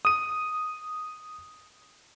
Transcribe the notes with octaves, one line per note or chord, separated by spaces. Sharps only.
D#6 D#7